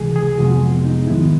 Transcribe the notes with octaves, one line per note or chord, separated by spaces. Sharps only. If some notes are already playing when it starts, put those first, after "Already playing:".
Already playing: C#2 C3 E3 G#3 G#4
G#4
F2 C3 F3 G#3 B3 F#4
D#4
G#2 D#3 G#3 B3 E4